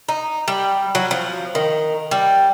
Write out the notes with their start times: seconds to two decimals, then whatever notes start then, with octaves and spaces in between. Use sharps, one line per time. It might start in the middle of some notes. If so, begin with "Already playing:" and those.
0.08 D#4
0.48 G3
0.95 F#3
1.11 F3
1.55 D#3
2.11 G3